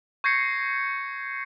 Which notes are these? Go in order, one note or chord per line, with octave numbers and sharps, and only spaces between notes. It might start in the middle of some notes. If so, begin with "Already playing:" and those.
C#6 G6 G#6 A#6 C7 C#7